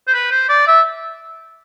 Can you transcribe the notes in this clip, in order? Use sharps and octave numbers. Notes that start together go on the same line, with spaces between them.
C5
B4
C5
D5
E5